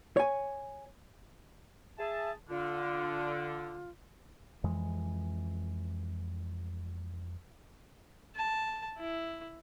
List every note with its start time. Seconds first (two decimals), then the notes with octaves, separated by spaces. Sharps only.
0.17 C#5 G#5
1.98 G#4 E5 A5
2.49 D3 F4
4.64 F2 E3 G#3
8.35 A5
8.98 E4